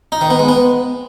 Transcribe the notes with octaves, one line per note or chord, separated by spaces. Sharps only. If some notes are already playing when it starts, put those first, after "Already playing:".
D#4
D#3
B3
G#3
B3